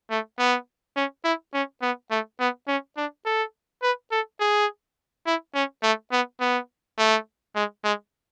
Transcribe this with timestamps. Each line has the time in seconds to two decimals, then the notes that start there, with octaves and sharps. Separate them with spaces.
0.11 A3
0.39 B3
0.96 C#4
1.24 E4
1.53 C#4
1.82 B3
2.11 A3
2.40 B3
2.68 C#4
2.97 D4
3.25 A4
3.83 B4
4.11 A4
4.40 G#4
5.26 E4
5.55 C#4
5.83 A3
6.12 B3
6.40 B3
6.99 A3
7.55 G#3
7.84 G#3